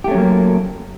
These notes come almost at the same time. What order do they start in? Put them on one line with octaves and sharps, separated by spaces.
G4 A3 C#4 F#3 A#3